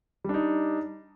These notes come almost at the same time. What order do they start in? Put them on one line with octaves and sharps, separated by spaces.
G3 D4 D#4